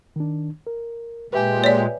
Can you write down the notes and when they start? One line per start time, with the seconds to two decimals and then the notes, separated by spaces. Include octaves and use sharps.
0.16 D#3 D4
0.67 A#4
1.33 A#2 G#3 G4 B4 E5 G#5
1.64 C#5 D5